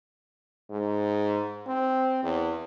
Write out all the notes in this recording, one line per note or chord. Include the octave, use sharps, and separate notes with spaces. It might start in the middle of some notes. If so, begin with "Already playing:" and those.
G#2
C4
E2